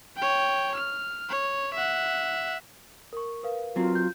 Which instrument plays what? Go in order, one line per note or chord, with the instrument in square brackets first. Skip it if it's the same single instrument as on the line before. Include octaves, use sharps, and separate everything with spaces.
[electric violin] C#5 G5
F6
C#5
E5 F#5
[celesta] A#4 C#6
A#4 B4 F5
[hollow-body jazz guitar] F#3 C4 [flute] F4
[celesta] G6